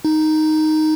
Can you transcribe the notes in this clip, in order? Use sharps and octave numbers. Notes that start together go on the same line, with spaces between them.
D#4